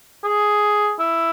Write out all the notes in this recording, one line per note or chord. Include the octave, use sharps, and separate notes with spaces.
G#4
E4